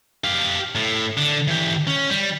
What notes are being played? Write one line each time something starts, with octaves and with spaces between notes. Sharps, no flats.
G4 F5
A2
D3
E3 G4
C#4
G3